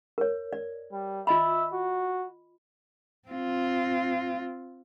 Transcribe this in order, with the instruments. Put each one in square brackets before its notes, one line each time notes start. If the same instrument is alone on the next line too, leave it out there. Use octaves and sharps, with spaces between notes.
[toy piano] A#4 C#5
D5
[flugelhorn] G3
[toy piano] F4 D#5 B5 [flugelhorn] E5
[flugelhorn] F#4
[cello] C4 F4